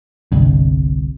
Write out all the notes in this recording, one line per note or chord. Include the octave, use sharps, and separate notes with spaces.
G1 C2 G2